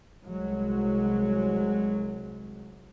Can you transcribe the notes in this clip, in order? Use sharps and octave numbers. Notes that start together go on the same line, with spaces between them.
C2 F#3 G#3